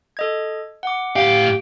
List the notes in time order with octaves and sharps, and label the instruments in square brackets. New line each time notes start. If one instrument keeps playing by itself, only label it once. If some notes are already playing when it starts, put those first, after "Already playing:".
[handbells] A4 D#5 G#6
F#5 D6
[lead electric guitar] A2 F5 [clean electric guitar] G4